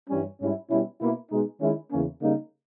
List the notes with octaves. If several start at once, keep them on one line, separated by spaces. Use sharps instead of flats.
G2 E3 G3 C#4
G#2 G3 C#4 E4
B2 G3 C#4 E4
B2 A#3 E4
B2 G#3 D#4
D#3 G#3 C#4 E4
E2 C#3 E3 A#3 C#4
C#3 G3 A#3 D#4